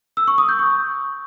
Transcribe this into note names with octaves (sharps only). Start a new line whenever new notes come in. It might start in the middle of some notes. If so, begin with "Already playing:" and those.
E6
C#6
D#6
G6
C#6